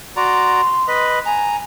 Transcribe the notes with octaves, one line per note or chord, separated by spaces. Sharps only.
F#4 D5 A#5 C6
B4 D#5 B5
G#5 A#5